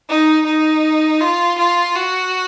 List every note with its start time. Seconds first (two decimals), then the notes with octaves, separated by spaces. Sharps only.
0.09 D#4
0.46 D#4
1.21 F4
1.58 F4
1.96 F#4